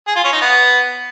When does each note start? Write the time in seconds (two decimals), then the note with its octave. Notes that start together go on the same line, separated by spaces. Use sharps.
0.08 G#4
0.16 F4
0.24 C#4
0.33 D#4
0.41 B3